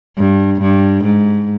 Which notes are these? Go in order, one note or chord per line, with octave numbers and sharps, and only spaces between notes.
G2
G2
G#2